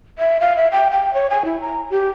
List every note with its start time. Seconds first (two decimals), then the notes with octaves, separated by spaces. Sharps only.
0.18 E5
0.41 F5
0.57 E5
0.72 G5
0.91 G5
1.14 C#5
1.30 G#5
1.45 E4
1.61 A#5
1.91 G4